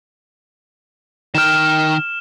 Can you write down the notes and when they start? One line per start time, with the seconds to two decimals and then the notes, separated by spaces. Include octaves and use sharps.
1.35 D#3 G5 F6 E7